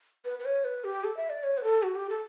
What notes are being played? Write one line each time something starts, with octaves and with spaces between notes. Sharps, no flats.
B4
B4
C#5
B4
G4
A4
E5
D5
C#5
B4
A4
F#4
G4
A4